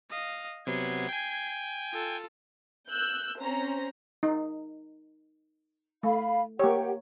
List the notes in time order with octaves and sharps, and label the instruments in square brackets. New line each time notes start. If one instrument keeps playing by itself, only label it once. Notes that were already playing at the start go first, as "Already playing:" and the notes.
[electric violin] D#5 F5
[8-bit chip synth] C3 F#3 B3 [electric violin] G#6 C7
[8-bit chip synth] G5 G#5
[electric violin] F4 A4
[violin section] E6 F#6 G6
C4 C#4 C5 A#5
[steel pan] D#4
[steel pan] A3 [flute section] F5 B5
[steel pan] A#3 C#5 [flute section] G4 F#5 G5